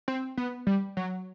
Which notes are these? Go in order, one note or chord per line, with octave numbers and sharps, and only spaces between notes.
C4
B3
G3
F#3